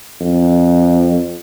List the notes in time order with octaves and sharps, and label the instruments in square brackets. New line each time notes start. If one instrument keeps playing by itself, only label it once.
[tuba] F2